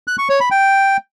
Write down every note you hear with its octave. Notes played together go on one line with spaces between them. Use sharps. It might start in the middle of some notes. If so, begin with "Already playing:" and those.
F#6
C#6
C#5
B5
G5